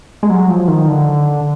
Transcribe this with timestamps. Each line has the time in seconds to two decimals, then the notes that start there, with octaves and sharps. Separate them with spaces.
0.23 G#3
0.30 F#3
0.49 F3
0.68 D#3
0.88 D3